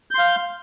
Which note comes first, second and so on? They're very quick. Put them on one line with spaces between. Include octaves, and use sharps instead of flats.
G6 C6 F5